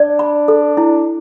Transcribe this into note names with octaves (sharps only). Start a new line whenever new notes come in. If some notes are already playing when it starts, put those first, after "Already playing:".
Already playing: D4 D5
B5
A4
E4